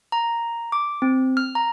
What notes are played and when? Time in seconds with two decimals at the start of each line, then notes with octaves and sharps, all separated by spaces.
0.12 A#5
0.72 D6
1.02 C4
1.37 F6
1.55 A#5